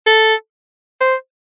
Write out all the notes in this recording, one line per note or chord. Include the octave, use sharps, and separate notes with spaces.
A4
C5